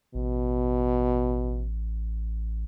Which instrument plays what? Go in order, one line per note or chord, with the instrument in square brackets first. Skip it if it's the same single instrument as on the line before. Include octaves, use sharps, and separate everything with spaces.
[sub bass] A1 [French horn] B2